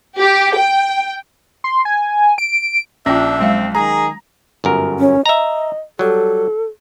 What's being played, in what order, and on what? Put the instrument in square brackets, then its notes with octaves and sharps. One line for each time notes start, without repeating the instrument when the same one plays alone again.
[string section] G4
G5
[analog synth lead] C6
G#5
D7
[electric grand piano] A#1 G5 [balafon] C#4 F4 [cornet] D4 [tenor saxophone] E5
[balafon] F#3 G#3 F5 [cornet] C4
[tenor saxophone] D#3 [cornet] G#4 [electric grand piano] A#5
[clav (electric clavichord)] G1 F#2 A#4
[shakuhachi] C#4
[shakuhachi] D#5 [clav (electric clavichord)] E5 A#5
[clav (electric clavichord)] F#3 G3 [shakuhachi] A4